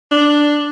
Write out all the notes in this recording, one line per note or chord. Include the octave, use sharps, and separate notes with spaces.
D4